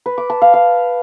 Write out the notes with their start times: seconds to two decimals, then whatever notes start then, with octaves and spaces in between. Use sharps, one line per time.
0.06 B4
0.18 D6
0.30 A5
0.42 F5
0.54 F5